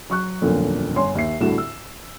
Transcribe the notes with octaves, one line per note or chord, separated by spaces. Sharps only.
F#3 C#6 F#6
D#1 B1 F2 A#2 D3 A4
G1 C#5 G#5 C6
D#2 E5 C7
C2 A2 D3 E4 F#4 E7
E6